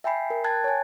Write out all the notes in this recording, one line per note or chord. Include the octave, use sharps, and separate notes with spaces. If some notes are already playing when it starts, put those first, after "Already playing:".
E5 G5 G#5 B5 C7
A#4
G5 A5 F#6 G#6 A6
C#5 G#5